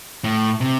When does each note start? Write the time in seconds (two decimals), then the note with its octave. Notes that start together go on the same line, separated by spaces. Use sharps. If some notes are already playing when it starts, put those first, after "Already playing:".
0.24 A2
0.61 C3